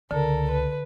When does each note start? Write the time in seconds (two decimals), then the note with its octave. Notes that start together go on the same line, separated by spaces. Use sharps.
0.11 C#2 D3 A4 A#4
0.51 B4